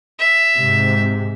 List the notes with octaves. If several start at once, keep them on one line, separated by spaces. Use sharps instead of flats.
E5
G#2 C3